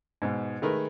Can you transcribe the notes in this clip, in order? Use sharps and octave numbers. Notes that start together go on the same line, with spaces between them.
G#2 B2
D#3 G#3 A3 A#4 B4